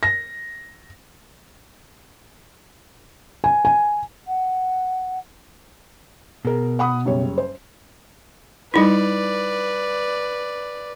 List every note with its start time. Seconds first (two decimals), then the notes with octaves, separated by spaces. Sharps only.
0.03 A#6
3.44 G#5
3.65 G#5
4.27 F#5
6.45 B2 G#4 A#4
6.79 F#5 B5 D#6
7.05 F#1 G3 C#5
7.38 C5
8.74 G3 D#4 E4 B4 D5